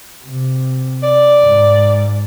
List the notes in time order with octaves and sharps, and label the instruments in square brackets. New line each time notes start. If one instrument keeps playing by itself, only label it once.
[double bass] C3
[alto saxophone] D5
[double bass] G#2